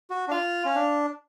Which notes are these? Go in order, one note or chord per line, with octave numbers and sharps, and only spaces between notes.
F#4
D4
F4 F5
C#4
D4